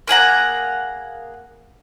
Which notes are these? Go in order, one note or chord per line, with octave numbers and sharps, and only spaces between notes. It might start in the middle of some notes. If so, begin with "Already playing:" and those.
A#3 G#4 F#5 A#5